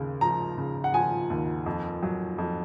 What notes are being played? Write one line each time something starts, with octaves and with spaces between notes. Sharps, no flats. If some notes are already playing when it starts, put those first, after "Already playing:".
Already playing: D#2 C#3
F3 A#5
C#3
F#5
F3 G#5
D#2
F2
F#3
F2